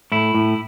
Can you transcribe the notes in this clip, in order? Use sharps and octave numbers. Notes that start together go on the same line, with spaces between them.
A2 E4
A2